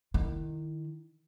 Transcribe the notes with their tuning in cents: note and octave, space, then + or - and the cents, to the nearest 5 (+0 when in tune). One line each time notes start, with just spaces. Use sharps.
D#3 -20 E4 -5